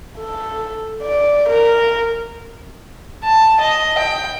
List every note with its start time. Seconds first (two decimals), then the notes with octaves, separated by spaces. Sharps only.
0.18 A4
1.03 D5
1.49 A#4
3.24 A5
3.60 D#5
3.98 G5